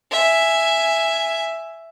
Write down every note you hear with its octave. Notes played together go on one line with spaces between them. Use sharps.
E5 G#5